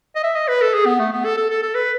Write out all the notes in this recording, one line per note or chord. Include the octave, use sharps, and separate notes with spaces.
D#5
E5
D#5
B4
A4
G#4
B3
A3
B3
A4
A4
A4
A4
B4